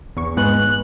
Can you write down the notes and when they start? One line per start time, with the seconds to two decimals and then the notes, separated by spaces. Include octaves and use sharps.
0.17 E2 C#6
0.37 G#2 G#3 B3 F#6